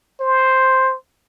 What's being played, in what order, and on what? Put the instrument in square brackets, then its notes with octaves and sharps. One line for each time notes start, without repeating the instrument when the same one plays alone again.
[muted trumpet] C5